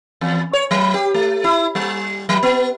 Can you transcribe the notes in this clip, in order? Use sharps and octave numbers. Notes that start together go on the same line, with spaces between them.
E2
C#5
F#3
G4
A3
E4
G3
F#3
B3